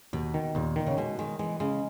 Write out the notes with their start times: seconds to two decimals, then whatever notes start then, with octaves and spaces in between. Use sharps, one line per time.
0.13 D#2 B2
0.34 D#3
0.55 D#2 A#2
0.76 D#3
0.87 C#3
0.97 B2 G#3
1.19 D#3 G#3
1.39 E3 G#3
1.60 C#3 G#3